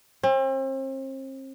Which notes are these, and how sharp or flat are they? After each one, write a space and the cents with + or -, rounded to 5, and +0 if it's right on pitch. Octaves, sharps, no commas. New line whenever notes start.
C4 +40